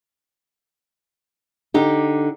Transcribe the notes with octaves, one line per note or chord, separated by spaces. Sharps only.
D3 D#4 G4